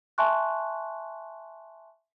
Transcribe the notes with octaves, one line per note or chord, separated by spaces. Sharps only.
E5 G#5 A5 C6 C#6 F#6